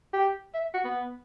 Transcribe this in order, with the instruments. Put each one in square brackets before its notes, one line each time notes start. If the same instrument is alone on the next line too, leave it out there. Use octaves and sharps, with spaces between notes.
[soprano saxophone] G4
E5
F#4
B3